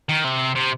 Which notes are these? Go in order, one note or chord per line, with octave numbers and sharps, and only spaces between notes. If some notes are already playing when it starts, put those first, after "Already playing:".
D#3
C3
C3